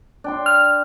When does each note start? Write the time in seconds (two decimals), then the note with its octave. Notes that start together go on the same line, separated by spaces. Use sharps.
0.24 D4 G5 C6
0.46 F6